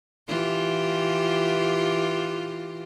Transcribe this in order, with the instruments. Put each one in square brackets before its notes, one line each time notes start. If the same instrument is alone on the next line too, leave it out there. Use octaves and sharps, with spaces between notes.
[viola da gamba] E3 F4 G4